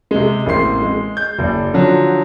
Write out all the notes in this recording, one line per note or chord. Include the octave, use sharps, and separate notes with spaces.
C3 G#3
A1 A#3 C4 C6 C7
G#3
G6
F#1 D5
D3 F3 F#3